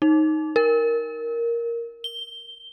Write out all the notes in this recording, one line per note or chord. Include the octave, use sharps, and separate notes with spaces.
D#4
A#4
G7